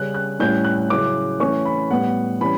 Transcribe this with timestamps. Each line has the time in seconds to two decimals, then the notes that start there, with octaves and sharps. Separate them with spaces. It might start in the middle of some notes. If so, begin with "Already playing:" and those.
Already playing: C#3 G3 C#4 F#6
0.14 F#6
0.39 A2 G3 C#4 E4 G6
0.64 F#6
0.90 C#3 F#3 C#4 E4 D6
1.40 E3 A3 C#4 E4 C#6
1.65 B5
1.91 A2 G3 B3 F#5
2.41 E3 G3 C#4 B5